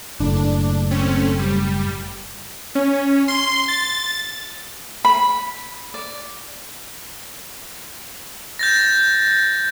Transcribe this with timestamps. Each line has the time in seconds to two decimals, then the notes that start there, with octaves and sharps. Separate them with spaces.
0.20 F#1 A2 D4
0.91 A3 C4 C#4
1.39 G3
2.75 C#4
3.28 C6
3.68 A6
5.05 B5
5.94 D5
8.59 G6 A6 A#6